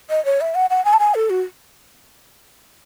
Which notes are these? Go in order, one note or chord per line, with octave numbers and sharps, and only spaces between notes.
D#5
C#5
E5
F#5
F#5
G#5
A5
G#5
A4
F#4